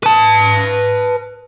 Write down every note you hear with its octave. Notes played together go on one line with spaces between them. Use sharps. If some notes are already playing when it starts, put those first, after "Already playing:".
B4 A5